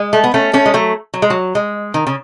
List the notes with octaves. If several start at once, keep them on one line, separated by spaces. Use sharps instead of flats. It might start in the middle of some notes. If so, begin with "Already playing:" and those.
Already playing: G#3
A3
B3
A3 C#4
A3 C#4
G#3
F#3 A3
F#3
G#3
F#3
G#3
D#3
C#3